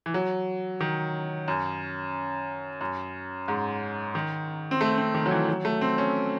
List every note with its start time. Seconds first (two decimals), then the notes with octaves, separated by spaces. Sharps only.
0.06 E3
0.14 F#3
0.81 D#3
1.48 F#2
2.81 F#2
3.48 G#2
4.15 D#3
4.71 C4
4.81 A3
4.98 C4
5.14 D#3
5.26 F#3
5.31 E3
5.48 F#3
5.65 A3
5.81 C4
5.98 C#4